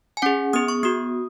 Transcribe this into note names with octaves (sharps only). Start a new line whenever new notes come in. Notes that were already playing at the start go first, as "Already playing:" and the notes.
G#5
C#4 G#4 F#5
B3 G#4 D#6
C#6
B3 F#4 D#6